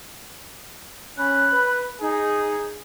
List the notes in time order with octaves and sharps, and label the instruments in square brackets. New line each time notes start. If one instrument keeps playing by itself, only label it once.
[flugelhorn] C#4 [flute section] B5 F#6
[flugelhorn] B4
[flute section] D#4 [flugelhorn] G#4